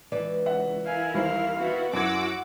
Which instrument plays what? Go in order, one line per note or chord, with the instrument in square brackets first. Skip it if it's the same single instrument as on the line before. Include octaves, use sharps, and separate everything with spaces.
[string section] C#2 [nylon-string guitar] E3 B4 D5
[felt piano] E5 F#5
[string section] E4 A#4 [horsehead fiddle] F5 G#5
[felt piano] D#2 G3 C5 [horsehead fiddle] F5
[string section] B3 E4 F#4
[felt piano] F#2 G#6 [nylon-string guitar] F#3 [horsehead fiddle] E4 F#4 [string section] F#5 D6 E6